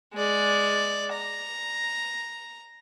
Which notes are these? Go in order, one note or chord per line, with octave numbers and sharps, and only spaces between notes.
G#3 D5
A#5